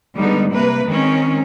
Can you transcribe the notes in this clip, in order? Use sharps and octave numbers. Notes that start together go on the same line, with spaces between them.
D3 G3 G#3 B3 D#4
C3 A#3 B4
D#3 G#3 C4 C#4